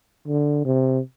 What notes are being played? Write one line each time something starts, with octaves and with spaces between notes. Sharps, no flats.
D3
C3